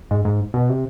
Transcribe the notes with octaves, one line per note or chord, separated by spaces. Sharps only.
G#2
G#2
B2
C3